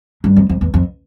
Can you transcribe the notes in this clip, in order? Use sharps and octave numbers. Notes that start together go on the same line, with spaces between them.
G2
F2
F2
E2
F2